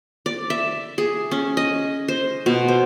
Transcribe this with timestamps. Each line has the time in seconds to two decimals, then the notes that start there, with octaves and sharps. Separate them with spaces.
0.26 D5
0.50 E5
0.98 G#4
1.31 C#4
1.57 D#5
2.08 C5
2.46 B2
2.68 C5